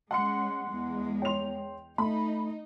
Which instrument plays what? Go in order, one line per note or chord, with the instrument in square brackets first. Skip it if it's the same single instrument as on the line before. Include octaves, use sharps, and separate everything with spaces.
[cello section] G#3 C#4 [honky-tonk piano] F#5 C6 C#7
[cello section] E2 G#3
[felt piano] C#5 C6 [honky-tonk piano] G5 F7
[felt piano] A3 [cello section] D#4 [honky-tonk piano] B5